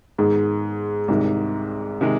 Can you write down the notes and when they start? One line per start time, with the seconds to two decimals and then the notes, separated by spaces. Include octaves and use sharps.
0.18 G#2 D#3 G#3 B3
1.08 C2 G#2 C3 D#3
2.01 C3 D#3 G#3